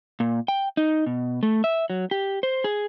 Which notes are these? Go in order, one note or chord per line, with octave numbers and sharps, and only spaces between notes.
A#2
G5
D#4
B2
A3
E5
F#3
G4
C5
G#4